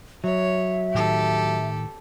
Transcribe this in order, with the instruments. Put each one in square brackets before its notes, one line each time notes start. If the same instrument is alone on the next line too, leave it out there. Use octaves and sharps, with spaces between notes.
[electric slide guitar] F#3 [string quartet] C#5 [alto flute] E5
[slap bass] A2 D#3 [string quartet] G4 A4